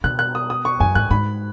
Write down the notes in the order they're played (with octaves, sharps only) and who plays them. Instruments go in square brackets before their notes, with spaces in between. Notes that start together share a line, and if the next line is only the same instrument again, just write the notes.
[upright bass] B2 [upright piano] F#6
[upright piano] F#6
D#6
D#6
C#6
[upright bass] F#2 [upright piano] G#5
[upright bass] G#2 [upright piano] F#6
[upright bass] G#2 [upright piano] B5